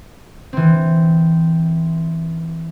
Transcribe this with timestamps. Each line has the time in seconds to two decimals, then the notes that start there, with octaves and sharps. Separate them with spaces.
0.53 E3 C4